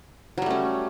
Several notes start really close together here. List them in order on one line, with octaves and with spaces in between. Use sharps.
F#3 G3 A3 C#4